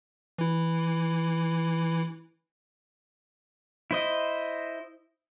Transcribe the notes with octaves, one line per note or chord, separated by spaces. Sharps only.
E3 E4
E4 C5 D#5